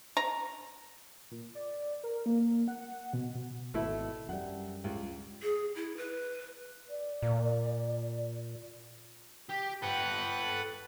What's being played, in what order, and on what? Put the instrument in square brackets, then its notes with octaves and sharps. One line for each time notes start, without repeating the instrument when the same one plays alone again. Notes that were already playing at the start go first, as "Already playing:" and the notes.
[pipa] A#5
[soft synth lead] A#2
D5
A#4
A#3
F#5
B2
B2
[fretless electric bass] G#1 B2 [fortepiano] A3 E4
[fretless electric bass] F#2 G3 [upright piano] F#5
[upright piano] C#2
[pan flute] G#4
E4
B4
[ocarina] D5
[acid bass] A#2
[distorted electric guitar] G4
[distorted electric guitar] A4 G5 [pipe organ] B4 F#5